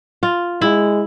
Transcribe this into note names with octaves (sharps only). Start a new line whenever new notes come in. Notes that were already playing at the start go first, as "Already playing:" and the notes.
F4
G#3 E4